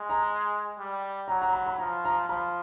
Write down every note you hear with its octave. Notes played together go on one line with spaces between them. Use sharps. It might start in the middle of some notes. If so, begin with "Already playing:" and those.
Already playing: G#3
A#5
G3
F#3 A#5
A#5
B5
B5
F3 A#5
A#5
F3 B5